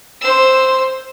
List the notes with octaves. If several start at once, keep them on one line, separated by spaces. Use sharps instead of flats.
C5 E6